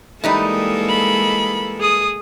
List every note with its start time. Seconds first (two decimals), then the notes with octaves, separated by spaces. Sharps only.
0.24 E3 G3 G#3 A#3 D#4 A4
0.89 B5
1.80 G#4 D#6